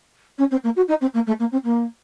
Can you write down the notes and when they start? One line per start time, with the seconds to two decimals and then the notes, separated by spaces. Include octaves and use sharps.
0.38 C#4
0.50 C4
0.63 A#3
0.76 F#4
0.87 D#4
1.00 C4
1.13 A#3
1.26 A3
1.39 A#3
1.51 C4
1.64 A#3